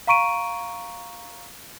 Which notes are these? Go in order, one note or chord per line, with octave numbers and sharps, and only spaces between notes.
F5 A#5 C#6 D7 D#7